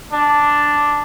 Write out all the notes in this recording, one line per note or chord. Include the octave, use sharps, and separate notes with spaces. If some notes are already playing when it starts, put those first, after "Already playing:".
D4